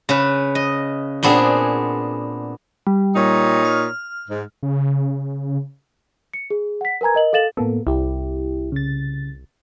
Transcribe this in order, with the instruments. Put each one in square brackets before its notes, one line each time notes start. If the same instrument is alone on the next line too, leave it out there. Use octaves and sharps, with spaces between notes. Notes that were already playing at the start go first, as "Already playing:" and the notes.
[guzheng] C#3 B4
D#5
A#2 B3 C4 D4 G#4
[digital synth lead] G3
[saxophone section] A#2 D#4 C#5
[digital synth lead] F6
[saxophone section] G#2
[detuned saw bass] C#3
[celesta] C#7
G#4
F#5 B6
A#4 B4 G#5 A#5 G#6
A#4 D#5 F#7
A4 F5 A6 E7 F#7
[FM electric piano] A2 A#3 B3 [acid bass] A4
[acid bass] C2 [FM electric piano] E4 G4
[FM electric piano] C#3 A6